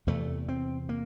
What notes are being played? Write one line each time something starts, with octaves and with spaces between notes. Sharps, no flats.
E2 C3 A3
C4
A#3